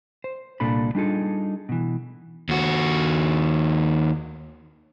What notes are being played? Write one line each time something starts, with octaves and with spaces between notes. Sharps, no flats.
C5
C2 A#2 D4 A4 B5
G3 D4 D#4 F4 G#4 A4
B2 E3
D#2 F#4